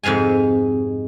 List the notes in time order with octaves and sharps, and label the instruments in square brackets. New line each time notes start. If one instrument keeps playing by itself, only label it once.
[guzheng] F2 G#2 C3 F5 G#5